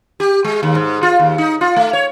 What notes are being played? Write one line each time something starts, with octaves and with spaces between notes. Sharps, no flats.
G4
G#3
D#2
G#2
F4
D#2
D#4
F4
A3
C#5